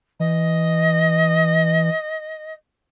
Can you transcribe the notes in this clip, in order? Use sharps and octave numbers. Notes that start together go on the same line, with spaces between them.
E3 D#5